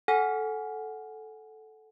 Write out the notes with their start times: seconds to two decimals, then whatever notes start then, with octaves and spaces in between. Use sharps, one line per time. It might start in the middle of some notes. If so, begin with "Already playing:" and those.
0.08 A4 F#5 G#5 F6 B6